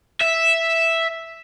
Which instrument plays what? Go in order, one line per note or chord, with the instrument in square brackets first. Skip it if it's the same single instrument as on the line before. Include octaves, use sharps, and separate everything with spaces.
[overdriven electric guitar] E5